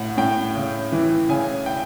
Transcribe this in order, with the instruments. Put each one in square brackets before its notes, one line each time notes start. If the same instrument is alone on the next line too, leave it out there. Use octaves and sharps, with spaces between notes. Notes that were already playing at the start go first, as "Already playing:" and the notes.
Already playing: [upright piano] A2 F#5
A2 G5
C#3
E3
C#3 G#5
G5